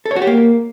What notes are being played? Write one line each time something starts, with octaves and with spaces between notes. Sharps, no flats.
A4
C#5
F#4
G4
A#3